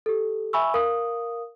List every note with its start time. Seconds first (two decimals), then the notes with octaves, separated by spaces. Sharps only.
0.06 G4 A4
0.53 E5 G#5 B5 C#6 E6
0.74 A#4 F5 D#6